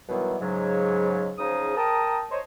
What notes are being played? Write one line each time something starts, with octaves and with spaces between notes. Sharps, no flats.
B2 D#3 E3 F#3 G3 B3
G#2 C#3 F#3
G#2 C#3 F3 D#4 G#4 D#6
A#4 G5 A5 A#5 D#6
C5 C#5 D#5